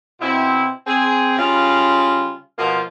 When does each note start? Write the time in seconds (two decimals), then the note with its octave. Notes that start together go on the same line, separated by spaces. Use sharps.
0.21 B2 C4 E4
0.87 C4 G#4
1.38 C#3 G3 F4
2.59 B2 F3 A#3 F4